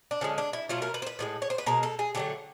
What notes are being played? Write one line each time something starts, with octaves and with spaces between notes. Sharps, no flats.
D4
D3 F3 G#3 C#4
D4
E4
B2 F#3 A3 F4
A#4
B4
C5
B4
A2 F3 G#3
C#5
C5
B4
B2 G#3 A#4
A4
G#4
D3 F#3 A3 G4